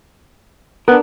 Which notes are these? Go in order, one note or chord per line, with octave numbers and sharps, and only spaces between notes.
B3 D4 A#4